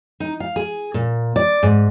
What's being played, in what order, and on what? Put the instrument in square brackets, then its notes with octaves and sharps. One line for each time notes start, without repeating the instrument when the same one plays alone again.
[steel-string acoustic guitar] D#4
F5
G#4
A#2
D5
G#2